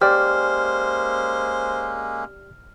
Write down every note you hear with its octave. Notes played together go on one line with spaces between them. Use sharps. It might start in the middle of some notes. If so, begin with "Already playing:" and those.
G#3 A#3 C#4 G4 C5 D5 F6